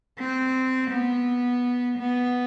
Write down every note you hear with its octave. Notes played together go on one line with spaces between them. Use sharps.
C4
B3
B3